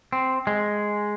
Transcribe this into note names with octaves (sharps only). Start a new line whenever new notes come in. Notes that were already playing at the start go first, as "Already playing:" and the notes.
C4
G#3